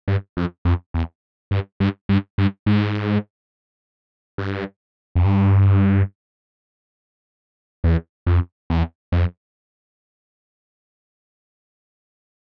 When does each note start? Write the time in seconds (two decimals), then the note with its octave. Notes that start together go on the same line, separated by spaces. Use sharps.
0.08 G2
0.37 F2
0.65 F2
0.94 E2
1.51 G2
1.80 G2
2.09 G2
2.38 G2
2.66 G#2
4.38 G2
5.15 F2
5.25 G2
7.84 E2
8.26 F2
8.70 E2
9.12 F2